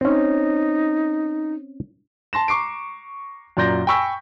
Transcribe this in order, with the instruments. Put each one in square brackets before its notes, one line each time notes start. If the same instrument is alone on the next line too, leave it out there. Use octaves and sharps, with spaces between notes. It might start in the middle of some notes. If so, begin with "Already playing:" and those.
[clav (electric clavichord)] C4 C#4 [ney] D#4
[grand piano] A5 C6 A#6 E7
A#5 C#6 D6 C7 D7
F#2 A#2 D5 C6 G6 A#6
G5 G#5 B5 C#6 E6 B6